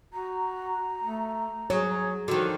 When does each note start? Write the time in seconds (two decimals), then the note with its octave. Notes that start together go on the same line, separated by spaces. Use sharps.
0.13 F#4 A#5
1.03 A3
1.70 F#3 G#4 C#5
2.28 D3 D#3 F3 F#4